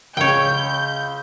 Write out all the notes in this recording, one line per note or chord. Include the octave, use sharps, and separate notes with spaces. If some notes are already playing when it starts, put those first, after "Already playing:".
C#2 C#3 C#5 G5 G6